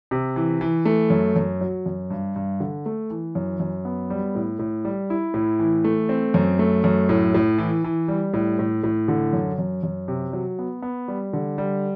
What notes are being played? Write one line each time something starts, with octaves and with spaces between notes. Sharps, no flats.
C3
E3
E3
A3
F#2
F#2
F#3
F#2
G2
G2
D3
A3
E3
F#2
F#2
B3
G3
A2
A2
G3
E4
A2
E3
A3
C4
F#2
A3
F#2
A2
A2
E3
E3
G3
A2
A2
A2
D3
F#2
F#2
F#2
C3
F#3
B3
B3
G3
D3
G3